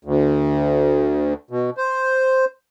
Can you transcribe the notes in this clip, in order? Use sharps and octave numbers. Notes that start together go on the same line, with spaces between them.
D2
B2
C5